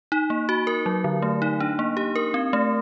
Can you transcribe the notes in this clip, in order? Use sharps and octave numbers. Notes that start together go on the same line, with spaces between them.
D#4
A#3
F#4
A#4
F#3
D3
A3
D#4
D4
A#3
G4
A#4
C4
A3